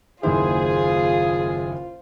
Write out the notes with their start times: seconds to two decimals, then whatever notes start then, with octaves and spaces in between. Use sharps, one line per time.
0.23 F#1 D#2 E4 F4 G#4 C5